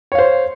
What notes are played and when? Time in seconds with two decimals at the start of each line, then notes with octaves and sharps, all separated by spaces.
0.12 C#5
0.15 F5
0.19 C5